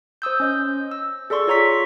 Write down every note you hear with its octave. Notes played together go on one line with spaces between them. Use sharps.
C5 D#6 E6 G6
C#4 D#5 G6
E6
G#4 A4 D5 C6 C#6
F4 C#5 A#5 C#6 B6